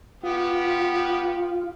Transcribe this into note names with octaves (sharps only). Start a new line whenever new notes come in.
B3 F4 G4